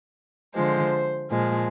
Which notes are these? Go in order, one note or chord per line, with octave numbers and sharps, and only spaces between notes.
D3 F3 G#3 C5
A#2 F3 G#3